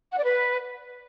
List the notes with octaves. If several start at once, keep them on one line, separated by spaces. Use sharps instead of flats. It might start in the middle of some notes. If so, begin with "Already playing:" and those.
F#5
D5
B4